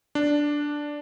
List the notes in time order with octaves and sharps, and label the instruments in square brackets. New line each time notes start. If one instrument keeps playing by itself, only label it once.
[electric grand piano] D4